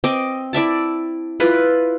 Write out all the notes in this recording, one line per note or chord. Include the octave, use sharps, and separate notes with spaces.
C4 D#5 D6
E4 D5 E5 A5
E4 F4 B4